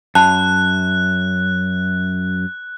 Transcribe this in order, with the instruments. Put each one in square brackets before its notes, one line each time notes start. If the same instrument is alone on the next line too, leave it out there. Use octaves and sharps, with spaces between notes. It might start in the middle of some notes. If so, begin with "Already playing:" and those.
[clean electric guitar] F#2 [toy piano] A5 B5 [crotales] F#6